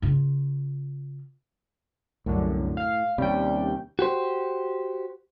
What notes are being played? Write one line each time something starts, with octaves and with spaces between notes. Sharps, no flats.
C#3 F4
C2 F#2 A2 D3
F5
D#2 C3 G3 C#4 G5
F#4 G4 C5